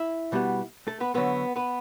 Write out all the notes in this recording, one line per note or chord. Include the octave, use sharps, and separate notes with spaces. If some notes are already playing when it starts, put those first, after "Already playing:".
Already playing: E4 E5
B2 G3 B3
A3 A4
B3 B4
D3 F#3 A3 B3 B4
B3 B4